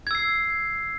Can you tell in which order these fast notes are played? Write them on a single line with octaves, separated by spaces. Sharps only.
G#6 E6 C7